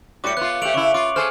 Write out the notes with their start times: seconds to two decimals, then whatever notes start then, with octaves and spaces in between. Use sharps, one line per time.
0.24 A2 G3 F#4 D6 C#7
0.37 B3 F4 F#6
0.62 A3 G4 D7 F7 F#7
0.74 C#3 E4 C#6
0.94 F4 C#6 D6
1.16 G#4 A4 C5 G#5 F6